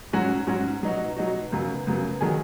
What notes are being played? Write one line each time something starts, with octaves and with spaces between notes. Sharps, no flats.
G#2 F#3 C#4 F#4
G#2 F#3 C#4 F#4
B2 F#3 D#4 F#4
B2 F#3 D#4 F#4
F#2 C#3 F#3 B3
F#2 C#3 F#3 B3
D#3 F#3 B3 G#4